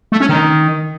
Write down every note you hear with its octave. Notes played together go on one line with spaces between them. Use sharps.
A3
C#4
D#3